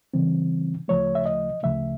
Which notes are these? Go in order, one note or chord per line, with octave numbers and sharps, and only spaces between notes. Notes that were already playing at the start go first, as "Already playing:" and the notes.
C#3 E3 G3 C4
D2 C#3 F3 A3 C#5
E5
D#5
D2 C#3 F3 A3 E5